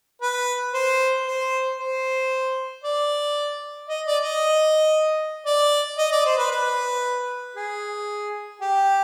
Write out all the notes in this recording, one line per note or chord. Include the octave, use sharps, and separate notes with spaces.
B4
C5
C5
C5
D5
D#5
D5
D#5
D5
D#5
D5
C5
B4
B4
G#4
G4